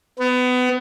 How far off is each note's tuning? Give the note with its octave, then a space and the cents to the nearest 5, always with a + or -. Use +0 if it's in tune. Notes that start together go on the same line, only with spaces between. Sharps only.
B3 +25